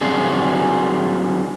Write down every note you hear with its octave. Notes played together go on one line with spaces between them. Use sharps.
F#3 G3 C4 D4 F#4 G#4